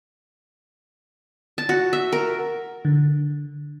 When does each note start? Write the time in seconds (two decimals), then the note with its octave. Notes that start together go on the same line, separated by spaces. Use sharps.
1.58 A5
1.69 F#4
1.93 E5
2.12 A#4
2.85 D3